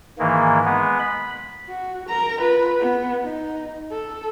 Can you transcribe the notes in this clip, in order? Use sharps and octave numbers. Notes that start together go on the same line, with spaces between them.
G#2 D#3 E3 A#3
G#3 B3
B5
F#4
A#4 A#5
F4 B4
B3
D#4
A4